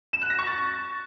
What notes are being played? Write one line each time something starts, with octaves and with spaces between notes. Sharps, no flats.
E7
F#6
A#6
C#6
A6